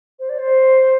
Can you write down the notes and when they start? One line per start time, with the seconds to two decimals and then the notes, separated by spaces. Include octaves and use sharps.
0.19 C5
0.29 D5
0.39 C5